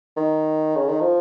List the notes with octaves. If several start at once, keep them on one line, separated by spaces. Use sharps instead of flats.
D#3
C#3
D#3
F3